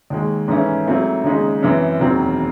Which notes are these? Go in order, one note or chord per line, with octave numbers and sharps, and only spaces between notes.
D#2 D#3 G#3
G#2 E3 A3 C#4 E4
G#2 F#3 A3 C4 E4
D#2 C#3 G#3 D#4
F#2 E3 C4
E1 D#2 D#3 F#3 C4